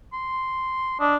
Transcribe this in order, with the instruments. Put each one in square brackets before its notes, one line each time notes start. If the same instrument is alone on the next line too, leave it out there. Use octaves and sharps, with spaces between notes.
[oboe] C6
[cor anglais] D4 [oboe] D#5